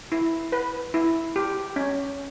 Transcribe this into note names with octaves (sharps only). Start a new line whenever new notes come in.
E4
B4
E4
G4
C#4